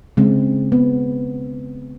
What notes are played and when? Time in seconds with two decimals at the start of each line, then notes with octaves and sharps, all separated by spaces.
0.17 C#3 G#3 C4
0.72 B3